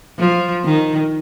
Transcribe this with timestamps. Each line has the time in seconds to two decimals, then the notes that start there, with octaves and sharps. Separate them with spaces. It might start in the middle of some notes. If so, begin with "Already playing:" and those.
0.19 F3
0.64 D#3